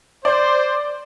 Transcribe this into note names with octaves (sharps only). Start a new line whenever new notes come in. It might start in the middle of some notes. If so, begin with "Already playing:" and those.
C5 D5